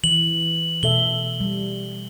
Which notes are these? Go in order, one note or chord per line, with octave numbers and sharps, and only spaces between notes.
E3 F#7
B2 A4 E5 G7
G3